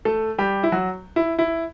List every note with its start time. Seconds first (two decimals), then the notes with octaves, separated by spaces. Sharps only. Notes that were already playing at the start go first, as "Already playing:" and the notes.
0.05 A3 A4
0.38 G3 G4
0.63 E4
0.72 F#3 F#4
1.16 E4
1.39 E4